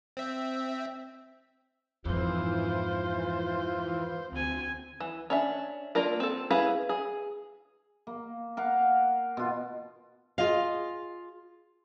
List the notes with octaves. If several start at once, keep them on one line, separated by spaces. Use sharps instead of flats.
C4 E5
F2 G#2 E3 F4 C5
D2 C4 G#5
E3
C#4 D4 E5
A#3 D4 F4 A#4
C4 A4
C#4 E4 G#4 B4 F5
G#4
A#3
A#4 F5 F#5
B2 F4
F4 G#4 D#5 F5